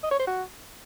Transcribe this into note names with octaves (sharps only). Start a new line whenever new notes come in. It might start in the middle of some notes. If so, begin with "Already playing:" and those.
D#5
C#5
C5
F#4